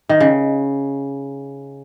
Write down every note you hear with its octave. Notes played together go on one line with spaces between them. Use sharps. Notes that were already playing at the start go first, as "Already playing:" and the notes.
D#3
C#3